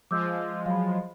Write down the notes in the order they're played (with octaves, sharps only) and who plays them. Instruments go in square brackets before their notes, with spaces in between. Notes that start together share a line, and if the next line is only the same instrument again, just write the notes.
[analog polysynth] F3 G#3 F4 [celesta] D6 E6 G6
[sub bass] F#3 [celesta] F5 B5